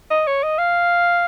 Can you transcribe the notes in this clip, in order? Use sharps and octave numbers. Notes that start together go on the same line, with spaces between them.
D#5
C#5
D#5
F5